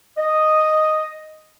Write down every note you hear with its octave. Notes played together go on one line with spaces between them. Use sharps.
D#5